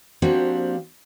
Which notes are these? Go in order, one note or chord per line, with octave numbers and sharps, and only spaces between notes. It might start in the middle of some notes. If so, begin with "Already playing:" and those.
F3 A#3 C4 D4 F#4 G4